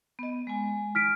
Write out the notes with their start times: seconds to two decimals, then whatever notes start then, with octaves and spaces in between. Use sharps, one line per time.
0.19 B3 D#5
0.47 G#3 G#5
0.95 F6 B6 D7